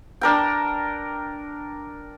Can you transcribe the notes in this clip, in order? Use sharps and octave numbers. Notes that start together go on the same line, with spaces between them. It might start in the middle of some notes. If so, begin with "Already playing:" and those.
D4 A#4 G5